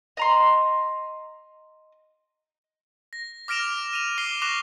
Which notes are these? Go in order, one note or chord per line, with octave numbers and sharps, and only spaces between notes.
D#5 A#5 C6
A#6
D6 F6 A#6 D7 E7 F7
D#7 F7
D6 C7 G7
C#6 D6 F#6 A#6 E7 F7